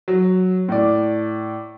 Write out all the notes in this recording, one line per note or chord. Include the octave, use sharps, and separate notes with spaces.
F#3
A2 D5